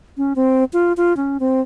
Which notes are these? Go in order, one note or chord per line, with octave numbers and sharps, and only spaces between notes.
C#4
C4
F4
F4
C#4
C4